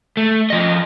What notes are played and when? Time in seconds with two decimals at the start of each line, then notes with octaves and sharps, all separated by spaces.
0.17 A3
0.50 F3 D#5